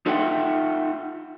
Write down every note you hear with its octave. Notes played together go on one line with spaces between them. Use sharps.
D#4 F4 A4 E5 F#5 G5